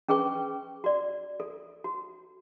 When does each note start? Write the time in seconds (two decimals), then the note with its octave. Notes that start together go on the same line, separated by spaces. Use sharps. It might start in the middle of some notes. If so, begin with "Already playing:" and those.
0.09 C#4 G#4 B4 G5 C#6
0.84 F#4 D5
1.40 A4
1.84 F#4